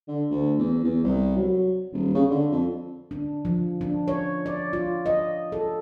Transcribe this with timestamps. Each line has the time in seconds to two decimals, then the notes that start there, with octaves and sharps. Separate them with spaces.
0.08 D3
0.31 D2
0.59 E2
0.84 E2
1.04 C2
1.36 F#3
1.93 D#1
2.15 C#3
2.30 D3
2.52 F2
3.11 D4
3.45 F3
3.81 D4
4.08 C#5
4.46 D5
4.73 F4
5.06 D#5
5.52 A4